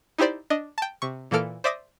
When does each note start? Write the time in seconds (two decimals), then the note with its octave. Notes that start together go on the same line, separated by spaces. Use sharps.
0.18 D#4 E4 G4 C5 D5
0.50 D4 D#5
0.78 G5 A5
1.02 C3 C#6
1.31 A#2 E3 A#3 A4 F6 D7
1.64 C5 D5 E5 D6 D#6 A#6